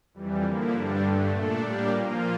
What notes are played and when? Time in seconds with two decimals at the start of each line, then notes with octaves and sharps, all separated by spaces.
0.14 F2 E3 G3
0.43 D3 F3 A#3 E4
0.71 G2 D3 G3 D4
1.01 G2 D3 A3
1.30 A#2 A3 D4 A4
1.59 A2 G3 A#3 D4 G4
1.88 A#2 F3 A#3 F4